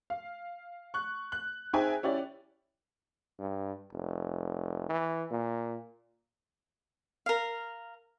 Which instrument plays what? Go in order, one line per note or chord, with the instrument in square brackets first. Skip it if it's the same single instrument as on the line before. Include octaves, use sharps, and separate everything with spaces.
[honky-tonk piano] F5
C#6 F#6
F#6
C4 D#4 G#4 E5 G5 G#5
C#4 E4 G4 D5
[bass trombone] G2
F1
E3
A#2
[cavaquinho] A#4 F5